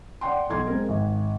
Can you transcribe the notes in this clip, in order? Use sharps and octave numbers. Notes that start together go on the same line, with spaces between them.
D5 F#5 G5 C6
B1 C6 G#6
G#3 C4 A#4
G#1